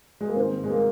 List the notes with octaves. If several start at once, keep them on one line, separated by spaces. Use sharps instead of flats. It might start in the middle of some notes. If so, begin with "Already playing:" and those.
G#3
A#3
G#2 D#3 C4
G#3
A#3